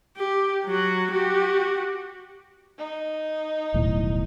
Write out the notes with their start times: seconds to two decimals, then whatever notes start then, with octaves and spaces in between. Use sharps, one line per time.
0.17 G4
0.66 F#3 F#4
1.12 F#4 G4
2.78 D#4
3.74 D#1 B1 A2